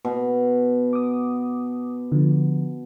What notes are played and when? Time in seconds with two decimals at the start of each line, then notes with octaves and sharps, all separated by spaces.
0.05 B2
0.93 D6 D#6
2.12 D3 F3